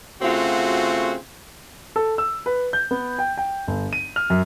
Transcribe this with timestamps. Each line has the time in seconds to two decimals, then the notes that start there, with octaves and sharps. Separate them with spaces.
0.22 C#3 A3 C4 F4 F#4
1.96 A4
2.18 E6
2.46 B4
2.73 G6
2.91 B3
3.19 G5
3.37 G5
3.68 G1
3.93 D#7
4.16 F6
4.30 F#2